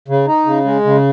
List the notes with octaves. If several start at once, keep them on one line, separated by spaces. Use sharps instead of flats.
C#3
D#4
C#3
G#3
C#3